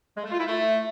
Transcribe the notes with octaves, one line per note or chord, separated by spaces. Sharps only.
G#3
A3
F4
E4
A3